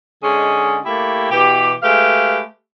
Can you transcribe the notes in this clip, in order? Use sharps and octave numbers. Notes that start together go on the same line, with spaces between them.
D3 G#3 C#4 D#4 G#4
A3 A#3 E4 G4
B2 E3 G4
G#3 A3 G4 B4 F5